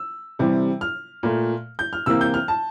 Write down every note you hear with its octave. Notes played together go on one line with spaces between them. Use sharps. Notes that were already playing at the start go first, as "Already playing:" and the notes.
Already playing: E6
C3 E3 G3
F6
A#2 A3
G6
F6
C3 E3 A#3 E6
G6
F6
A5